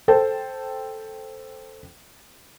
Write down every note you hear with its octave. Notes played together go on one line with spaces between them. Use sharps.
A4 C5 G5 A5